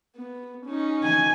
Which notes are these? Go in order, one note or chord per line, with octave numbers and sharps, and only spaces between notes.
B3
C#4 D#4
G#5